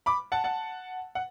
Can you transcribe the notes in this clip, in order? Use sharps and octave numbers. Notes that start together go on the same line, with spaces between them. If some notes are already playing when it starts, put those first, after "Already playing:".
B5 D6
F#5 A5
F#5 A5
F#5